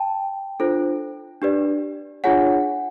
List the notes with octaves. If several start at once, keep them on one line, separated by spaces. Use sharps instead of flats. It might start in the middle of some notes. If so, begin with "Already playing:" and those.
Already playing: G5 A5
D4 F4 A4 C5
D4 G4 B4 D5
D4 F4 G#4 C#5 F#5 G#5